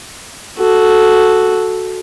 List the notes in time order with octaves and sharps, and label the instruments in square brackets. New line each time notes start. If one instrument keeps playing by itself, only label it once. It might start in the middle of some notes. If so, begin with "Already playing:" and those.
[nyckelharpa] F#4 A4